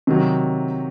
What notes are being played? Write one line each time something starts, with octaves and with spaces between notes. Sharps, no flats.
C3 D#3 F#3